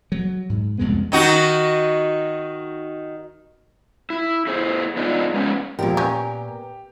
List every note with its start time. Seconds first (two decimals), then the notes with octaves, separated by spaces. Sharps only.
0.12 F#3
0.49 G#2
0.78 C2 F2 G#3 B3
1.12 D#3 D#4 F#4
4.10 E4
4.47 E4 G#4 C5
4.97 B3 D4 D#4 F4 F#4 G#4
5.34 G#3 B3 C#4
5.79 E1 A#1 A#2 F3 G4 A#4
5.97 B3 C#4 G6